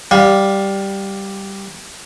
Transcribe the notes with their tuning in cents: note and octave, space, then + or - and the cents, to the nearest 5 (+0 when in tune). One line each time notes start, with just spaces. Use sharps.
G3 +0 F5 +20